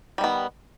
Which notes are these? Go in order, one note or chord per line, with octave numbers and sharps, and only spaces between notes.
D#3 G3 B3